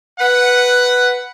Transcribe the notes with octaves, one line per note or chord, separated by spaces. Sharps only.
B4 F#5